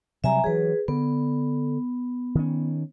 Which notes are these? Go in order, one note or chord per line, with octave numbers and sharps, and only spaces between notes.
C3 F#3 G3 E5 G#5 A#5
E3 F#3 G#4 B4
D3 B3
D#3 C#4